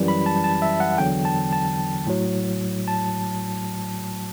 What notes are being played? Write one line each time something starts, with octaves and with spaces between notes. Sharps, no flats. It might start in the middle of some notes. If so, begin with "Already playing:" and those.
Already playing: F#2 E3 G3
B5
A5
A5
E5
F#5
E2 D3 F#3 G5
A5
A5
A2 F#3
A5